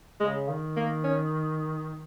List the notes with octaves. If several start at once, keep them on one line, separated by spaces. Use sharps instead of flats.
C#3 G#3
D#3
A#3
C#4